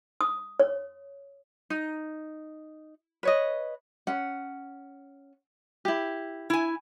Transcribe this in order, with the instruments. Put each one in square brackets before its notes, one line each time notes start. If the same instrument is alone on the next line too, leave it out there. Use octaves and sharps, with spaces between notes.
[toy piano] D#6
C#5
[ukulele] D#4
B4 C#5 D#5
C#4 F#5
E4 G4
[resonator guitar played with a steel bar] E4 G#5